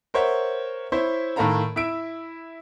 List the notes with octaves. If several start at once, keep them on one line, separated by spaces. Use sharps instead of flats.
A#4 C5 C#5 E5 F#5
E4 C5 C#5
A2 D#3 A4 F5 A#5 B5
E4 E5 E6 D7